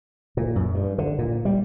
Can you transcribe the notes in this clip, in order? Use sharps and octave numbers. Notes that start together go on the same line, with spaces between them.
A#2
F#2
G2
D3
A#2
G3